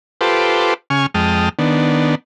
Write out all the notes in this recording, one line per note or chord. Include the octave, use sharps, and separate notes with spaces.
F4 G4 A4 B4 C5 D6
C#3 G#5 C#6 F6
F2 G#3 G5 A5 D#6 F6
D#3 B3 D4